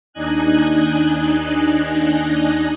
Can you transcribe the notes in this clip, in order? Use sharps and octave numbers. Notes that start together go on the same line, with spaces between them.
D#2 D4 D#4 D#5 G#5 F#6